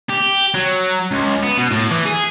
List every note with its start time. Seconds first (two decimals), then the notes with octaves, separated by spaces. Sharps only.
0.09 G4
0.54 F#3
1.11 C#2
1.43 B3
1.58 B2
1.71 A2
1.91 E3
2.05 G#4